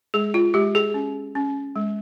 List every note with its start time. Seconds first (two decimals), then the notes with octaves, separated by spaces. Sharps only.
0.14 G#3 G#4
0.34 F4
0.54 G#3 G4
0.75 G#4
0.94 C#4
1.35 C#4
1.76 G#3